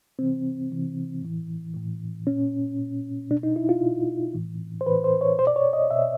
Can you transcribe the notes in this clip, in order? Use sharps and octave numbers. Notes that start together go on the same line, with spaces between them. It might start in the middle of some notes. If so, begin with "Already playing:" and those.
C3 E3 C4
C3 E3
A2 E3
A2 E3
A#2 C#4
A#2
B2 D4
D#4
E4
F4
B2
A2 E3
C5
A2 E3 B4
C5
C#5
B2 C5
D5
C#5
D#5
B2 E5